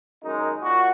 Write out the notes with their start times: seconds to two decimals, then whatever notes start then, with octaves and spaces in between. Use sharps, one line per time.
0.24 F#2 D#3 G#3 D#4
0.63 A#2 F#4